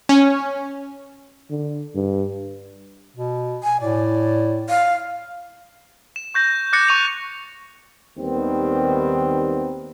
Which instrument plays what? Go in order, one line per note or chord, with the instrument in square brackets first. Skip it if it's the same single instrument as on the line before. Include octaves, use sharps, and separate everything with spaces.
[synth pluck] C#4
[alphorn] D3
G2
[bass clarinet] B2
[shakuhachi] G#5
[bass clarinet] A2 [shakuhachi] D5
[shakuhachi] F5
[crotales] E7
C#6 G6 A#6
D6 F#6 A6 A#6 C#7
C#6 C#7 D#7 F7
[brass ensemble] D#2 D#3 G3 B3 C4